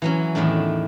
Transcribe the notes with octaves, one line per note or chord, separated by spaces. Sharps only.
E3 F#3 C#4
E2 A2 D#3 A3 D4